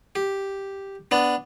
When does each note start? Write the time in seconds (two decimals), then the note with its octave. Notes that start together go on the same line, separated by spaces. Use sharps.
0.15 G4
1.11 B3 D4